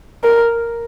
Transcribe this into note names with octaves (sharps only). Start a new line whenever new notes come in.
A#4